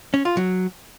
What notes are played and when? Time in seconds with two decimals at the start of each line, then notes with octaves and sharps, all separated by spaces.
0.14 C#4
0.25 F4
0.37 F#3